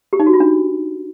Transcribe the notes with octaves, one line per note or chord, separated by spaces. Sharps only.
G4
D#4
F#4
F4
D4